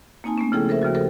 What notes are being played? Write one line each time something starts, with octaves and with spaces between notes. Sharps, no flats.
A#3 C4 D#4 G#5 A5
A3 B3 C#4
C#3 F3 E4 G#4 A4 G5
A4 A#4 C5 E5
D#2 C#3 F3 F#4
G4 A4 A#4 C5 G5